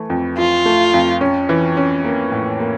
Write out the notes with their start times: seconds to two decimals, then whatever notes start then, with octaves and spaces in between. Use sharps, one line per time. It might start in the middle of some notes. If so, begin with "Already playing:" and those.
Already playing: E3 A3
0.10 F2
0.38 F2 F4
0.66 A3
0.94 F2
1.21 C#4
1.49 E3
1.77 C#4
2.05 A#3
2.32 A2
2.60 A#3